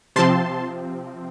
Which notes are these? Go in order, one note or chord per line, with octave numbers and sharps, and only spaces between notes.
C3 F3 C4 A5 C6